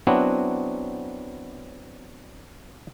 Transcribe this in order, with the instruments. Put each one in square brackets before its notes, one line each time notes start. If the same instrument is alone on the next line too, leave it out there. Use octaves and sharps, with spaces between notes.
[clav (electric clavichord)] F#3 B3 C4 D4 E4 F#4